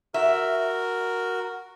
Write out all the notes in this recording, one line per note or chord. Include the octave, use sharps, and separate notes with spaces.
F#4 A#4 E5